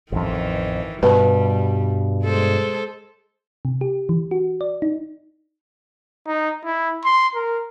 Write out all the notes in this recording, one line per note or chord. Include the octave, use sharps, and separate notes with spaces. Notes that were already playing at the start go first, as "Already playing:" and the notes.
A1 F2 D#3 E3
G2 B2 G3 B4
G#3 A4 C5
C3
G4
E3
F#4
D5
D#4
D#4
E4
C6
A#4